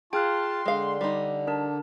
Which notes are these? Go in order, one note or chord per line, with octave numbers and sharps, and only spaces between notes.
F4 G#4 G5 A5 C6 F6 F#6
D3 G#3 F5
G3 D#4
D4 A#4 A5